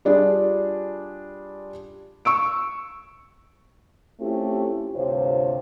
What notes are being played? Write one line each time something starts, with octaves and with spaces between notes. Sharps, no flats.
G3 D4 F4 G#4
C#6 E6 D7
A3 C4 C#4 E4 F4 G4
D2 G2 C3 F4 C5 C#5